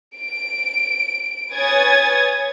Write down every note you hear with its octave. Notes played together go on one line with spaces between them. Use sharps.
D7
B4 C#5 G#5 D#6 G#6 A6